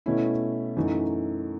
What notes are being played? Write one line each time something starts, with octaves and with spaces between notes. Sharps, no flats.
B2 A3 C#4 E4
F#2 E3 A3 D#4